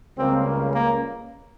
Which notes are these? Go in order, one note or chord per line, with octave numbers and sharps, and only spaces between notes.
C#2 C#3 G3 A#3 C4
A#3